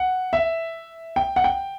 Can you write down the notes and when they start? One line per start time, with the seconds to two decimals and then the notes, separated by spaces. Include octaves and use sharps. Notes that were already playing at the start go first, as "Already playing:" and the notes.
Already playing: F#5
0.33 E5
1.16 G5
1.36 F#5
1.44 G5